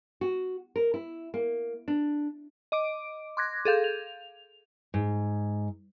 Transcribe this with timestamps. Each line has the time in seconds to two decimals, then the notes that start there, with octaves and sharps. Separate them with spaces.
0.21 F#4
0.76 A#4
0.94 E4
1.34 A#3
1.88 D4
2.72 D#5 D6 D7
3.37 C6 D6 F#6 G#6 A#6
3.65 G#4 A4 F5 G6 G#6
3.84 F7
4.94 G#2